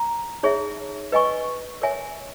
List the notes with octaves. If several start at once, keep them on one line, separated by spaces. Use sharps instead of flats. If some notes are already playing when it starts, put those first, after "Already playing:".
Already playing: A#5
D#4 G#4 C#5 E5
B4 D#5 G#5 C#6
A#4 C#5 E5 G#5